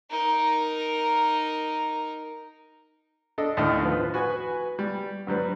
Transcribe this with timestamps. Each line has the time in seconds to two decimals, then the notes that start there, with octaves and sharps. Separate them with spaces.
0.11 D#4 A#4
3.38 D4 A4 D#5
3.57 D#2 A2 D4 D#5 F6
3.82 F3 B4
4.14 F#4 B4 G#5
4.79 G3
5.27 G2 F#3 G3 B4